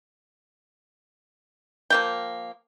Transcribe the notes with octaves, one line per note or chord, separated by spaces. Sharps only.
F3 A#3 G5